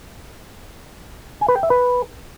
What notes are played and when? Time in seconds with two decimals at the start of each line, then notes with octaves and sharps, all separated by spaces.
1.41 G#5
1.48 B4
1.56 G5
1.63 E5
1.70 B4